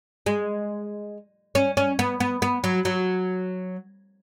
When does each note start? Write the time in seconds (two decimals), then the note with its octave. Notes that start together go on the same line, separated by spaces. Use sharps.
0.26 G#3
1.55 C#4
1.77 C#4
1.99 B3
2.20 B3
2.42 B3
2.64 F#3
2.85 F#3